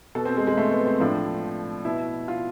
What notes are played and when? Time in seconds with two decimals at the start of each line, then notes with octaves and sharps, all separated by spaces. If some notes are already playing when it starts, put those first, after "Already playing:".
0.15 B2 A4
0.25 C4
0.37 G#3
0.47 G#3
0.57 A3
0.72 B3
0.86 C4
1.00 A2 F3 D4
1.85 B2 E4
2.28 F4